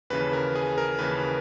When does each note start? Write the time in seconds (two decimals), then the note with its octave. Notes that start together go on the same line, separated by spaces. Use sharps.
0.10 D#2 C#3 E3 B4
0.33 A#4
0.55 G#4
0.78 A#4
0.99 D#2 C#3 E3 B4